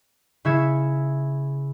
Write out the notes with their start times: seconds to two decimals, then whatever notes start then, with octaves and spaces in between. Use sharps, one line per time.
0.45 C#3 E4 E5 G#6 C#7